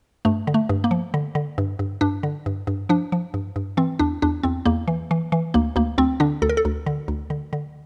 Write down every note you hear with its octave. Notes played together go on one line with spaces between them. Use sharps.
G2 A3
D3
A3
G2
A#3
F3
D3
D3
G2
G2
G2 D4
D3
G2
G2
F3 D4
F3
G2
G2
E3 C4
E2 D4
E2 D4
E2 C4
E2 A#3
E3
E3
E3
D2 A#3
D2 A#3
D2 C4
D3 D4
D2 A4
A#4
A4
D2
D3
D2
D3
D3